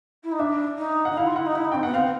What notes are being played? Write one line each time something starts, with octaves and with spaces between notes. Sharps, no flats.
E4
D#4
D4 E5
D#4
F#5
D#4
E4 F5
F4
E4 F#5
D#4
E4
D#4
C4 G5
B3 F#5
C4 F5